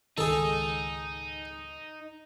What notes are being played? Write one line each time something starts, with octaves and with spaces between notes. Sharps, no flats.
C#2 G#2 D#3 D#4 G#4 A4